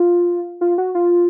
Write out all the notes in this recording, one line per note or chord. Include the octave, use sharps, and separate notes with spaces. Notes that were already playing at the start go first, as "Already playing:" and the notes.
Already playing: F4
F4
F#4
F4